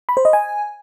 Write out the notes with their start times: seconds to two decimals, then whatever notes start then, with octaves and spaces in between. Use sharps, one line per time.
0.09 B5
0.17 C5
0.25 D#5
0.33 G#5